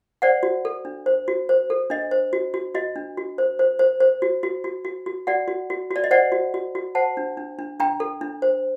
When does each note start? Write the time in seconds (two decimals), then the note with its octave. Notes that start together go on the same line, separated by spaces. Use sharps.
0.22 C5 D5 F#5
0.43 F#4
0.65 A4
0.85 D4
1.06 C5
1.28 F#4
1.49 C5
1.70 A4
1.90 D4 D#5
2.11 C5
2.33 F#4
2.54 F#4
2.75 F#4 D#5
2.96 D4
3.17 F#4
3.38 C5
3.59 C5
3.79 C5
4.00 C5
4.22 F#4
4.43 F#4
4.64 F#4
4.85 F#4
5.06 F#4
5.27 F#4 D5 F#5
5.48 F#4
5.70 F#4
5.91 F#4 D5
6.04 D#5
6.11 C5 D5 F#5
6.32 F#4
6.54 F#4
6.75 F#4
6.95 C5 F#5 A5
7.17 D4
7.37 D4
7.59 D4
7.80 D4 G5 A#5
8.00 A4
8.21 D4
8.42 C5